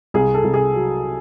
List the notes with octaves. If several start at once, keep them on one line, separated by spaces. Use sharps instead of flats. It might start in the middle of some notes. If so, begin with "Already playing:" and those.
C2 G#4
A4
C2
G#4
F#3